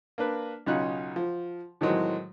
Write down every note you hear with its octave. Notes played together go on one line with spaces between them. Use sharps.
A#3 D4 B4
B1 C#3 C#4 D#4 F4 F#6
F3
A2 D#3 E3 F#3 G#3 C4